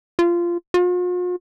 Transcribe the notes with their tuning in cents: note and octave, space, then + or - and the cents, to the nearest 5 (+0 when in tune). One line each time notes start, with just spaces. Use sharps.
F4 -15
F4 +45